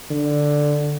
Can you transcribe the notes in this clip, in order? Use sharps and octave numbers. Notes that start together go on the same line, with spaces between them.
D3